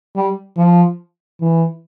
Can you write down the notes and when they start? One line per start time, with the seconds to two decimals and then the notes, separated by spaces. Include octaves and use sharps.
0.15 G3
0.57 F3
1.41 E3